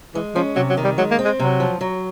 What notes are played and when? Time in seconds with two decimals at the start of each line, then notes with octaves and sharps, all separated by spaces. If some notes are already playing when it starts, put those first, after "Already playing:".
0.15 E3 G#3
0.35 F3 C#4
0.56 C3 F#3
0.70 F#3
0.77 D#3
0.85 G3
0.98 F#3 G#3
1.11 A#3
1.19 C4
1.25 G#3
1.40 C3 F#3
1.60 F3
1.81 F#3